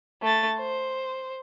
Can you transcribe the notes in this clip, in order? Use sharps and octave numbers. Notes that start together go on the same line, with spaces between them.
A3 A6
C5